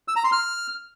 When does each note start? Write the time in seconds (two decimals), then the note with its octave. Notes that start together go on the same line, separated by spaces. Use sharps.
0.08 E6
0.16 A#5
0.24 C6
0.32 F6